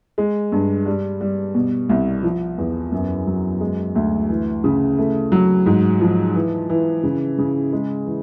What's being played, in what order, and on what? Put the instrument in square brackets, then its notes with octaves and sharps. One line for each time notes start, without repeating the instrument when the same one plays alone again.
[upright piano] G#3
G2
G3
G3
B2
C2
F3
E2
F#2
F#3
G#3
D2
E3
C#3
A3
F#3
G#2
F3
E3
E3
C#3
C#3
G#3
E3